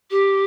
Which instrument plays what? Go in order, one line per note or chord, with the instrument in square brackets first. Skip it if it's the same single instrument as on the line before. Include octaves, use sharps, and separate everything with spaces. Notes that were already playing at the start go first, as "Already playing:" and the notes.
[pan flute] G4